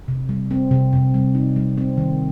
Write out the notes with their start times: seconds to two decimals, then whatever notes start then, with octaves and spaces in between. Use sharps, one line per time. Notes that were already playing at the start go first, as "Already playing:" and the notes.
0.08 C3
0.29 G3
0.51 C4
0.71 C3
0.93 C3
1.14 G3
1.35 D#4
1.56 G3
1.77 C4
1.97 D#3